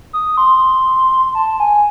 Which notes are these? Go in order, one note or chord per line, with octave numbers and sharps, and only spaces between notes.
D#6
C6
A5
G#5